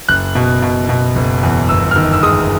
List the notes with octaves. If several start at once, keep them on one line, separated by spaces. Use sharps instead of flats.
F#1 F#6
B2
B2
B2
F#1
E2
G1 E6
F6
D#3 E6
E6
G#3 D#6